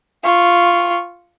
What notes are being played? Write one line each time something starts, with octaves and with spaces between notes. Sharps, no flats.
F4 C#6